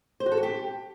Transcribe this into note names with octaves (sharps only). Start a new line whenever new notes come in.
C5
F#4
A4
F#4
G4